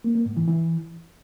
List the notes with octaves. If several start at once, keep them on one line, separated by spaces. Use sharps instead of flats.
A#3
A#3
G#2
E3
E3